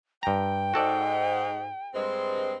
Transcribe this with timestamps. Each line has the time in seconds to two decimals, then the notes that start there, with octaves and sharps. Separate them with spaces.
0.23 G2 G5 A#5
0.74 G#2 F#4 A4 D5
1.94 G2 G#3 C4